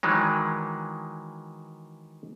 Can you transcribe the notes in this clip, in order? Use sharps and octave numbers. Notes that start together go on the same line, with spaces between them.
D#3 E3 F#3 G#3